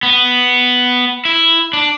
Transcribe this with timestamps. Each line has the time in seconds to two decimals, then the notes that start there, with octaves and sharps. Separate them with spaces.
0.03 B3
1.25 E4
1.73 D4